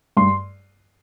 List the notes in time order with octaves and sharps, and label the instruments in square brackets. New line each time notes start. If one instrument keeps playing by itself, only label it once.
[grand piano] G2 C6